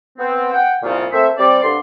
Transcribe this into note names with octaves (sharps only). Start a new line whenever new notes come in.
B3 C4
F#5 G5
C2 A#2 C#3 F4
A3 A#3 C4 C5 E5
G3 C4 D5
G2 D3 C6